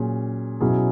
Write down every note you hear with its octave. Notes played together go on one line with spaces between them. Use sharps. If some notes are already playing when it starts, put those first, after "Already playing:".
Already playing: A#2 F#3 C#4 G#4
B2 F#3 C#4 E4 G#4